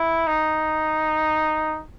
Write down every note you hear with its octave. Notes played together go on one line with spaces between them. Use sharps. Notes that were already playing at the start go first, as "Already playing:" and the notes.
Already playing: E4
D#4